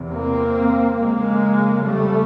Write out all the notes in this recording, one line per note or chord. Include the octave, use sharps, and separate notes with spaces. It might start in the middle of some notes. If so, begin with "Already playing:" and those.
Already playing: E2 C3
A#3 C4
F2 C#3 G#3 A#3
G3 A3